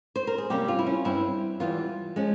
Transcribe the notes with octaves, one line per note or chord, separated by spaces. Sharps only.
C5
A#4
G#4
C3 G3 A#3 C#4 G4
F4
E4
C#4
G2 G3 C4 E4
E2 E3 G3 F4
F3 G#3 C#4